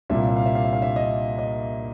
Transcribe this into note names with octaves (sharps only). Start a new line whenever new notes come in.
C2 A#2 G3 A#3 E5
F5
E5
F5
E5
F5
E5
F5
E5
D#5
D#5